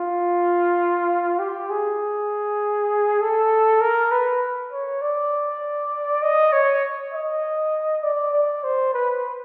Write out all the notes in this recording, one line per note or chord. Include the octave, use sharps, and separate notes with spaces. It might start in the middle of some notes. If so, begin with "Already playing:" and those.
Already playing: F4
G4
G#4
A4
A#4
B4
C#5
D5
D#5
C#5
D#5
D5
D5
C5
B4